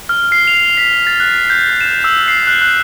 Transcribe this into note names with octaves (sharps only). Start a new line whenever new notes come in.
F6
C7
F7
B6
A6
F#6
G6
E7
E6
C7
F#6
F#6